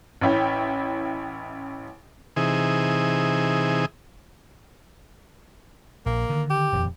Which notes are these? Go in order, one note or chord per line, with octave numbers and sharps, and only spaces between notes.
A1 C#4 E4 G5
C3 E3 D#4 G#4
A#1 A#3
D3 D#3
G4
D#1 F2